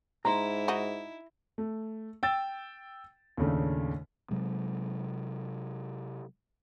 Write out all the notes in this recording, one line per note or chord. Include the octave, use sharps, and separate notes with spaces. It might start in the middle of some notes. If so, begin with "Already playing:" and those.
G#2 E4 A#5 C6
D#4 F#4
A3
G5 E6 A6
D#2 A2 C#3 A3 D4
C3 F#3 G#3